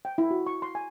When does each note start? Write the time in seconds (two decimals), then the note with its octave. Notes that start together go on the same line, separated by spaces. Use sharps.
0.05 G5
0.18 E4
0.31 F#4
0.47 C#6
0.62 C6
0.75 G#5